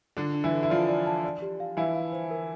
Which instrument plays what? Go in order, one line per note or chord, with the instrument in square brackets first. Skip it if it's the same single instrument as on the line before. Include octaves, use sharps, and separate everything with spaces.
[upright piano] D3 D4 [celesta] F4
[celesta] D4
[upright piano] E3 E4
[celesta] A4
[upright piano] E4
[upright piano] F3 F4 [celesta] D5
[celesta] D5
A5
D5
G4
F5
[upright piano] E3 E4 [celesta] F5
[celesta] F5
C5
A#4